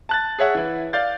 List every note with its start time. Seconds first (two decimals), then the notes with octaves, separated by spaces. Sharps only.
0.09 A5 F#6 A6
0.39 G#4 C#5 E5 F#5
0.55 E3 E4
0.93 D5 F5 G6 A6